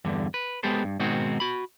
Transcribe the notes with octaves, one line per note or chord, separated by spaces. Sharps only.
E2 G2 D3
B4
G#3 B3 G4 A4 C5
G2
G#2 B2 D#3 G#3 C4 F#4
F#4 B5